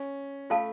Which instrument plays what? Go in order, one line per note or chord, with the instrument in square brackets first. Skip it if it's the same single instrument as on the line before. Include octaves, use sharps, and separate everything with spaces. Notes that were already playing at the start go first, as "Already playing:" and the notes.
Already playing: [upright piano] C#4
[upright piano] A3 [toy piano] F4 A4 F5 A5